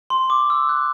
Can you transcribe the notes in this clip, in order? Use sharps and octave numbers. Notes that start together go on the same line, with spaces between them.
C6
D6
E6
F#6